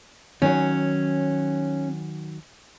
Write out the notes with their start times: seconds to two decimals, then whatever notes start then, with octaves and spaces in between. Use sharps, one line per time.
0.42 D#3 F#3 C#4